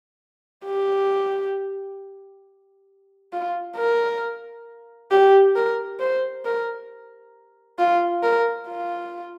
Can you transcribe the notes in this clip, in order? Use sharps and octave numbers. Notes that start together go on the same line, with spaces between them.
G4
F4
A#4
G4
A#4
C5
A#4
F4
A#4
F4